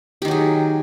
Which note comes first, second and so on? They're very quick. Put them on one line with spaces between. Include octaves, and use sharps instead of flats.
G4 D#3 F#3 G#4